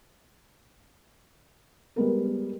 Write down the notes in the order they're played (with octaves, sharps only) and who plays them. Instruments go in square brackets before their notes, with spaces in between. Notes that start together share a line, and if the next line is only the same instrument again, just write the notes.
[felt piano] G3 G#3 B3 A#4